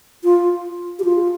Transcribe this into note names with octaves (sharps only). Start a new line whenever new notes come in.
F4
G4
F4